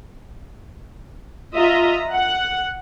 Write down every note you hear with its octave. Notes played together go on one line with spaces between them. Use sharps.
F4 D#5 E5 A#5
F#5